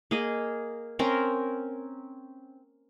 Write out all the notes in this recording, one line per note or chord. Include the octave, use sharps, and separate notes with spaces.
A#3 G#4 D#5
C4 C#4 A#4 C6